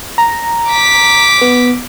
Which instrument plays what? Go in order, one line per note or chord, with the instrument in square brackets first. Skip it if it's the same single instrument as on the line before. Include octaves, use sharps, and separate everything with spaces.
[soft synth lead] A#5
[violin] D6 B6
[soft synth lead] B3